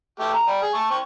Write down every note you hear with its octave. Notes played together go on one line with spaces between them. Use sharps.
A3 G4
A#5
G3
G#4
A5 C#6
C4 C#6